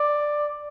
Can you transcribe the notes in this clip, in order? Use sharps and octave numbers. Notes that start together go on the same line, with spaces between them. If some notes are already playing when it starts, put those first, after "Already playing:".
Already playing: D5